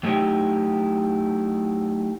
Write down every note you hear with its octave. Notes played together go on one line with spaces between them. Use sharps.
F#3 A3 D#4 E4 G4